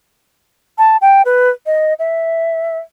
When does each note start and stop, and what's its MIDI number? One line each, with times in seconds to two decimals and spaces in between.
0.78 0.97 81
1.01 1.22 79
1.25 1.50 71
1.66 1.94 75
1.99 2.78 76